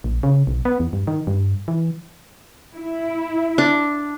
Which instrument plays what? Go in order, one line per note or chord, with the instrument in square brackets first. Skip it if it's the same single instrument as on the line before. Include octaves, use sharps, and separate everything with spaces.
[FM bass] A#1
C#3
B1
B3
E2
G2
D#3
G2
E3
[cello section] E4
[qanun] D4